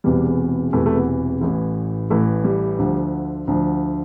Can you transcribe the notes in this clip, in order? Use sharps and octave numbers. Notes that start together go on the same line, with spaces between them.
E1 E2 C3 E3 G3
E1 E2 C3 E3 A3
A3
B3
A1 A2 E3
A1 A2 E3 A3
G3
D2 D3 F3
D2 D3 F3